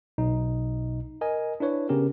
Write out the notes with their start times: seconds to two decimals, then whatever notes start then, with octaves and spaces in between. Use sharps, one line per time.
0.18 B1 B2 D#4
1.21 A#4 D#5 G#5
1.60 D4 E4 B4 C#5
1.89 C#3 B3 C#4 G4 A#4